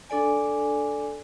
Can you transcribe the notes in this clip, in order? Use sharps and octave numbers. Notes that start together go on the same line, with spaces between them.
D4 A4 D5 G#5